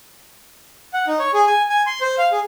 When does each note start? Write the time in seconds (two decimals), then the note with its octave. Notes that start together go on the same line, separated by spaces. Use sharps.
0.93 F#5
1.07 D#4
1.19 C#5
1.34 G#4
1.47 G#5
1.70 G#5
1.87 C6
2.01 C5
2.18 F5
2.32 G#4